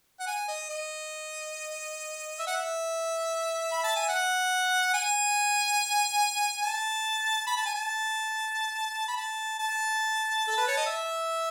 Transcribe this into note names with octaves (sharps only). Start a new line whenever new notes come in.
F#5
G#5
D#5
D#5
E5
F#5
E5
B5
A5
G#5
F#5
G#5
A5
B5
A5
G#5
A5
B5
A5
A5
A4
B4
C#5
D#5
E5